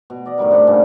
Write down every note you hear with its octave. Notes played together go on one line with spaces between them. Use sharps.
B2
D5 D#5
A2 D#3 G3 A#4
C3 D4 G4 F#5
G2 A#2 C#3